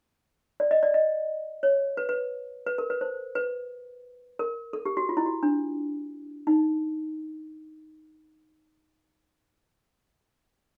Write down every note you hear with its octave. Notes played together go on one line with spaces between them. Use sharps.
D5
D#5
D5
D#5
C#5
B4
B4
B4
A#4
B4
C5
B4
A#4
A4
G4
F#4
F4
E4
F#4
D4
D#4